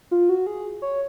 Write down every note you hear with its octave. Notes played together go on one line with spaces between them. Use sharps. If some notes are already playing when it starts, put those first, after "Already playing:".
F4
F#4
G#4
C#5